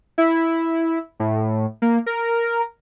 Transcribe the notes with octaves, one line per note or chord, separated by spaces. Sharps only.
E4
A2
A#3
A#4